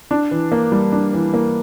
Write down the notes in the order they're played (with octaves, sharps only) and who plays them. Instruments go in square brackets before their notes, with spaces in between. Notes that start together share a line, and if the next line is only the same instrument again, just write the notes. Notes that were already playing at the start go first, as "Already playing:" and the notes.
[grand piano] D4
E3
A#3
G3
D4
E3
A#3